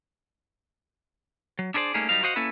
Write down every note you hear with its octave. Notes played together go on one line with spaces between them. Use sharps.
F#3
D4 E4 G#4 C5 D5
G3 A3 A#3 C#4 D#4 G#4
F#3 G3 D#4 A#4 F5
F#4 C5 D#5 F5 F#5
A#3 C#4 E4 A4 B4